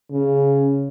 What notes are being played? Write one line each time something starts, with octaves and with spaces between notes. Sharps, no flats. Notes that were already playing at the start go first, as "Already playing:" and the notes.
C#3